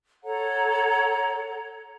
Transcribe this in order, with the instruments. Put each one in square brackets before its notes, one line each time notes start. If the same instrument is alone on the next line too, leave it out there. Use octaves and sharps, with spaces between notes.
[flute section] A4 C#5 F#5 A#5